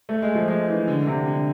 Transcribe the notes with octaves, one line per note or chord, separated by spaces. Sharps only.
A3
G#3
F3
G#3
E3
D3
D3
C3
D3